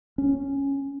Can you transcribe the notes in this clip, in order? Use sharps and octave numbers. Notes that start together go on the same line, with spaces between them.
C#4